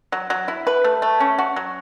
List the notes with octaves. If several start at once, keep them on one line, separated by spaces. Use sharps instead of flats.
F#3
F#3
E4
B4
A3
A3
C#4
F#4
F#3